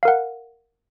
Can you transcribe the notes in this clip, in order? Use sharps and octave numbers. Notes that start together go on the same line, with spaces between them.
A#4 F5 F#5